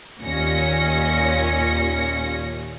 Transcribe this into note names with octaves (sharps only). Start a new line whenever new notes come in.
D#2 A#2 C#4 A#6 C#7